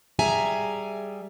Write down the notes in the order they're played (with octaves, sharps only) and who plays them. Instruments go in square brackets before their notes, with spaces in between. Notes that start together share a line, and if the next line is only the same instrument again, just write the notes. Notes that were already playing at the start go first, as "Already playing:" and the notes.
[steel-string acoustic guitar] G3 G#4 E5 G#5 A#5